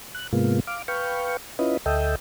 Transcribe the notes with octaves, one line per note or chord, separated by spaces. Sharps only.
F#6
G#2 C3 G#3 A#3 B3 F4
F5 D6
B4 F5 G5 C#6
C#4 E4 F4 B4 D#5
D2 A4 D#5 E5 G5